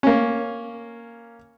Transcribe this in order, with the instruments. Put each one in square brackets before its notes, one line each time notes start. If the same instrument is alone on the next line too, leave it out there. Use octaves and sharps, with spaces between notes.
[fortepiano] A#3 C#4